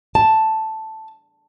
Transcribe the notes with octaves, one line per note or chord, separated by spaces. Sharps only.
A5